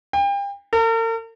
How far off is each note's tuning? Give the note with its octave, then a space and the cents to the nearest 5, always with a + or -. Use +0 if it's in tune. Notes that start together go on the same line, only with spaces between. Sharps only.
G5 +35
A#4 -45